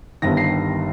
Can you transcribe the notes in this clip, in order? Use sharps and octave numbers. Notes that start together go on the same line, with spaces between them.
G1 G2 D#3 A#6
C7